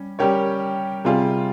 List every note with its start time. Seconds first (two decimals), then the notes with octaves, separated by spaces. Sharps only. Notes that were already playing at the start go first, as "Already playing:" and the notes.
Already playing: G3 C#4
0.19 G3 C#4 G4 A#4 C#5
1.05 C3 G3 C4 F4 G#4